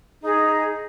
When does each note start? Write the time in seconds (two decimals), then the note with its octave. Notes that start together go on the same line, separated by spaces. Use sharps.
0.22 D#4 G#4